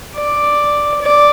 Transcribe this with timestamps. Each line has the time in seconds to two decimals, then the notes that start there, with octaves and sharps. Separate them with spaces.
0.16 D5
1.02 D5